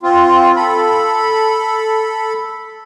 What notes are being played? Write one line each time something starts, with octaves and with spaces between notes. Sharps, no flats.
C4 F4
A4 B5